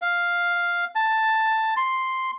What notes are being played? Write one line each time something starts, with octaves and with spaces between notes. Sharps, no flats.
F5
A5
C6